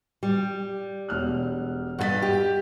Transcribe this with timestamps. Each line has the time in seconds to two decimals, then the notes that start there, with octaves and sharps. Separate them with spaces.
0.23 G3
1.09 E1 F6 F#6
1.99 G2 G#4 D#5 F#5 A6 B6
2.22 G4